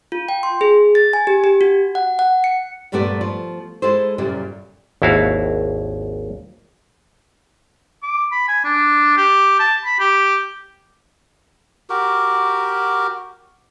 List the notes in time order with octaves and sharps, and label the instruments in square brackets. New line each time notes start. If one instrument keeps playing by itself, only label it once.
[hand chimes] F4
G5
C6
G#4
A6
G#5
G4
G4
F#4
F#5
F#5
C#7
[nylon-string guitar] G2 A#2 G3 A3 B3 D5
F3
G#3 E4 A4 C5
F#2 A#2 C#3 G3
[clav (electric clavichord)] G#1 D#2 E4 F#4 F5
[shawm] D6
B5
G#5
D4
G4
A5
B5
G4
[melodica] F#4 G4 A#4